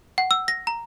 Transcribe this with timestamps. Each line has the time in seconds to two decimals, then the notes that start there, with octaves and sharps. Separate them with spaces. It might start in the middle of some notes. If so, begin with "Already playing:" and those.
0.18 F#5
0.31 E6
0.48 A#6
0.67 A#5